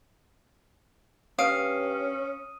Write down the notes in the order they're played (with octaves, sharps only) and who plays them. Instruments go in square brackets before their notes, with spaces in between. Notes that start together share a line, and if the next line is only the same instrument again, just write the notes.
[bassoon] G2 [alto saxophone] C#4 [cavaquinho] F5 [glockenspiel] D#6 D7 D#7